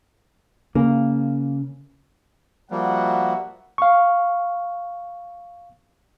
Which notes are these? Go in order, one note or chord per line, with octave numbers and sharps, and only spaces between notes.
C#3 A#3
F3 G3 A#3 F#4 E5 F#5
F5 C#6